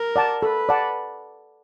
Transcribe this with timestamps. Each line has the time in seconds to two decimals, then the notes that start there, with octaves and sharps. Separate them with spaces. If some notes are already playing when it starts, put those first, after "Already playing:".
Already playing: A#4
0.16 D5 F#5 A5
0.42 A4 B4
0.69 D5 F#5 A5